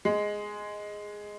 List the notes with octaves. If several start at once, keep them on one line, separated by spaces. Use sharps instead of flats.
G#3